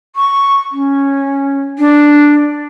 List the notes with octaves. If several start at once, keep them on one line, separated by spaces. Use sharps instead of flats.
C#6
C#4
D4